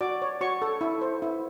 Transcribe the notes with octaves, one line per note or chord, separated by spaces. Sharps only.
F#4 D5 D6
C#5
F#4 C#5 C#6
A4
E4
C5
E4